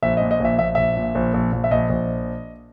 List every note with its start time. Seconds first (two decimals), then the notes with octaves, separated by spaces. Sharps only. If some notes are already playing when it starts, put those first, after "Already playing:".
0.02 A#1 E5
0.17 A#2 D#5
0.31 D#5
0.40 A#1 E5
0.59 A#1 E5
0.75 A#1 E5
0.97 A#2
1.15 A#1
1.34 A#1
1.53 A#1
1.64 E5
1.71 A#1 D#5
1.90 A#1